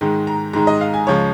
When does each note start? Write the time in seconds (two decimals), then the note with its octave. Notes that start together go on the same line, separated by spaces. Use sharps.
0.01 G#2 D#3 G#3
0.27 A#5
0.53 G#2 D#3 G#3 A#5
0.67 D#5
0.81 F5
0.94 G#5
1.07 C#2 C#3 F3 G#3 C#5